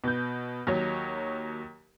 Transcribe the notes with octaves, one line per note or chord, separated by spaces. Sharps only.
B2 G6
D#2 F#3 C#5